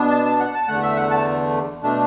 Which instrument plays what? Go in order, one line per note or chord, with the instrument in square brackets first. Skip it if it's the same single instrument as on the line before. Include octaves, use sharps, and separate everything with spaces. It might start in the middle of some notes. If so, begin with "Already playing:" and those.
Already playing: [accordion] B2 B3 D4
A5
A5
F#5
A5
E2 D3 A3 F#5
E5
F#5
A5
B2 A3 D4